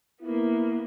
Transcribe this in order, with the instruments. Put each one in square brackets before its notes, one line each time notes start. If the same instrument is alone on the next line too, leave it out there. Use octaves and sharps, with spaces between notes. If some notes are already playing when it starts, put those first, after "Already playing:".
[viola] A#3 B3 [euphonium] E4